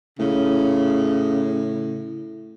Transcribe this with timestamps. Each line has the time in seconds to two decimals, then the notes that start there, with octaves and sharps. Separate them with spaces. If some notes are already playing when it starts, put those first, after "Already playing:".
0.19 A2 C#3